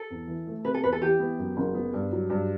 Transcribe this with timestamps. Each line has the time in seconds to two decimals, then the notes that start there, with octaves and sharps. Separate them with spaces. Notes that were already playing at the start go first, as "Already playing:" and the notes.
Already playing: A4
0.10 E2
0.28 E3
0.47 A3
0.64 C3 B4
0.74 A4
0.83 E2 B4
0.92 A4
1.01 E3 G4
1.20 B3
1.38 F#2
1.57 F#1
1.75 B3
1.94 G2
2.12 F#3
2.30 G2